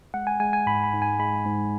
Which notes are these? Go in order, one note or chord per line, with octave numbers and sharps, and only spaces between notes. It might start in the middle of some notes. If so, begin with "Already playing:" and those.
G#3 F#5
G#5
G#3 G#5
G#5
G#2 B5
B5
G#2
G#5
G#3 B5
G#2